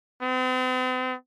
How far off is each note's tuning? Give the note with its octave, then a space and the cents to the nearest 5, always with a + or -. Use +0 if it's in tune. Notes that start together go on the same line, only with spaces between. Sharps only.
C4 -45